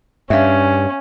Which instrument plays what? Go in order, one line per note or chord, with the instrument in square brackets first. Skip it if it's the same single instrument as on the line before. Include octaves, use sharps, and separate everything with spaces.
[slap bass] G2 [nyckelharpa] C#4 [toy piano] E5 F5